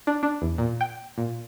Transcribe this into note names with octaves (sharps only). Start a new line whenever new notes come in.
D4
D4
E2
A#2
G5
A#2